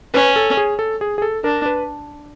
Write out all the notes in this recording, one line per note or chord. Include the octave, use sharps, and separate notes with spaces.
C#4 B4
A4
G#4
A4
G#4
G#4
A4
D4 A#4
B4